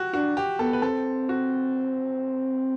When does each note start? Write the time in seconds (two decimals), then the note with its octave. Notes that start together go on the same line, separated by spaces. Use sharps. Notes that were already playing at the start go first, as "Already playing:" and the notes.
Already playing: F#4 G4
0.14 D4 F#4
0.37 G4
0.59 B3 A4
0.73 B4
0.82 C4 A4
1.29 F#4